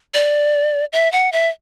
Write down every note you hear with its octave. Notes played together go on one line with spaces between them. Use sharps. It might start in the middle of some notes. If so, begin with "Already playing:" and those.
D5
E5
F#5
E5